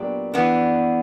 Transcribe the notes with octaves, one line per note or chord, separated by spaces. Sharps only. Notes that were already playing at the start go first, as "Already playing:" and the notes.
Already playing: A#2 F#3 B3 D4 G4
E3 B3 D4